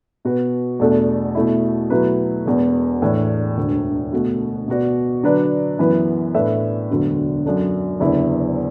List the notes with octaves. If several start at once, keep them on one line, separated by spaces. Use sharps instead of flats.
B2 B3 F#4 B4
E2 B2 A3 D4 A4
B2 A3 E4
B2 F#3 A3 E4 B4
E1 E2 B2 B3
A2 E3 D4
E1 D2 D3
B2 A3 F#4
B2 B3 F#4 D5
D3 F#3 D4 B4 D5
F#2 E3 B3 E4 B4
A2 A3 D4 B4 E5
E1 D2 D3 F#3 B3
F#2 F#3 D4 A4
F#1 E2 D3 B3 E4